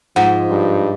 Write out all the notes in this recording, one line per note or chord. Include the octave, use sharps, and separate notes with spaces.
G#2 F3 F#5
G2